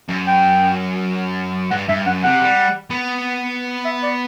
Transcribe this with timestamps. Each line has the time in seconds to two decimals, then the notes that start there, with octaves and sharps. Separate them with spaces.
0.09 F#2
0.27 G5
1.71 G2 F#5
1.88 G2 E5
2.05 F#2 F#5
2.24 C3 F#5
2.42 G3
2.90 B3
3.85 E5
4.03 D5